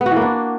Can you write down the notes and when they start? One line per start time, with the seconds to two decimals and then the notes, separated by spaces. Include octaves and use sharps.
0.01 B3
0.06 F#4
0.11 E3
0.16 A#3
0.22 D4